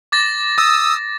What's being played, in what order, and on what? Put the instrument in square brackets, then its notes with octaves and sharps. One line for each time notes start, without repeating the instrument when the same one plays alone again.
[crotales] D6 A6 A#6
[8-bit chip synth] D#6 E6